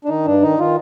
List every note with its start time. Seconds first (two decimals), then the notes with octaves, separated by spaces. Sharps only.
0.05 D4
0.09 D#3 D#4
0.26 G2 D4
0.42 D#3 D#4
0.59 D#3 F4